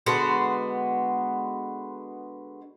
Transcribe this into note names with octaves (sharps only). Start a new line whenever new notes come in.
D3 G#3 B3 F#4